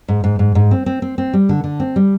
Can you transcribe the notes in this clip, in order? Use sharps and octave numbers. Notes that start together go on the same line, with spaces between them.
G#2
G#2
G#2
G#2
C4
C4
C4
C4
G3
D3
D3
C4
G3